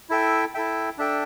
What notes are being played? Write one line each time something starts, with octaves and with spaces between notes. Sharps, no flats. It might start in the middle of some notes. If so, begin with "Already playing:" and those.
E4 A4 E5 G5
E4 A4 E5 G5
D4 A4 E5 G5